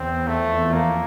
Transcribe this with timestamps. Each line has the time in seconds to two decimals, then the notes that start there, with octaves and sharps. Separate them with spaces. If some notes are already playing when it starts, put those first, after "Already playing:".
Already playing: E2 C4
0.27 F2 A3
0.73 F2 A#3